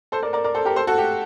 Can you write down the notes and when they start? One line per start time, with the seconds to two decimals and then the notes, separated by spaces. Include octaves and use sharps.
0.12 A4 C5
0.22 A#4 D5
0.33 A#4 D5
0.44 A#4 D5
0.55 A4 C5
0.65 G4 A#4
0.76 A4 C5
0.87 F#4 A4
0.98 G4